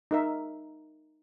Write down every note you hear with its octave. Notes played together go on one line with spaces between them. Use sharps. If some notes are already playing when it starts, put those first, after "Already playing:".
D#4 A#4 E5